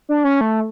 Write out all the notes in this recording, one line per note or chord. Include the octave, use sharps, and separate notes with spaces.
D4
C#4
A3